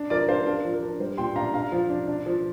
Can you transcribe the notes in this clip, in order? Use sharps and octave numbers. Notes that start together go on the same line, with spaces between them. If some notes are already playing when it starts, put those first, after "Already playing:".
Already playing: D4
F3 A#4 D5
D4 C5 F5
D4 A#4 D5
F3
A#4
D4
G3 C5
A#2 G5 C6
D4 F5 A#5
D4 F5 A#5
F3
D4
D4
F3